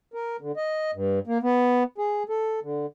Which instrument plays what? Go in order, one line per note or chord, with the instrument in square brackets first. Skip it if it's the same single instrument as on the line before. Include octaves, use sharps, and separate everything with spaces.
[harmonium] A#4
D3
D#5
G2
A#3
B3
G#4
A4
D3